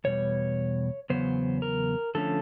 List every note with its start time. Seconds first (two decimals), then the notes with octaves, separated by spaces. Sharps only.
0.04 E2 B2 G3 C#5
1.10 E2 C#3 F#3 B3 C5
1.62 A#4
2.15 D3 F3 A3 C#4 A4